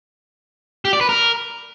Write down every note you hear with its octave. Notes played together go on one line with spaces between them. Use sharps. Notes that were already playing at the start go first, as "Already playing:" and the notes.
G4
D5
B4
A#4